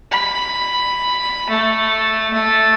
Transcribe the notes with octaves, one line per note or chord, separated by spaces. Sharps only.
B5
A3
A3